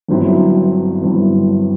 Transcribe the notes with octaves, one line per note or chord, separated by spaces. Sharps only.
G1 G2 F#3 C4 E4
G1 G2 F#3 C4 E4